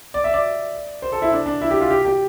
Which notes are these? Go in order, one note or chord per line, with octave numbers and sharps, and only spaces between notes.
D5
E5
D5
C5
A4
E4
D4
D4
E4
G4
F4
G4
G4